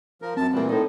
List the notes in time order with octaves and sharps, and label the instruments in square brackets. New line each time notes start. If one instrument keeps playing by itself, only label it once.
[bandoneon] F3 A#4
[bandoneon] F#2 A5 [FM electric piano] C4
[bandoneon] A#2 E3 [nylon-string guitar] G3 A#3
[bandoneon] A2 [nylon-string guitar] D#4 A4 C5